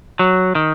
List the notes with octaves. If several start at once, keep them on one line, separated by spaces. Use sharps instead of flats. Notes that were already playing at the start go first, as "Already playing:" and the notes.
F#3
D#3